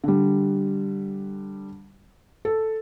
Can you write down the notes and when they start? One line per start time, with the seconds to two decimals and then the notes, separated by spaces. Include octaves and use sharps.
0.04 D3 G3
2.45 A4